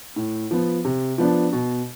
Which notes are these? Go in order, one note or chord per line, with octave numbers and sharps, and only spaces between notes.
A2
F3 B3
C3
F3 B3 D4
B2